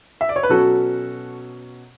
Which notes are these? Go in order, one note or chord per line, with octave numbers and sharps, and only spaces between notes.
E5
D5
C#5
B4
B2 F#3 C#4 F#4 A4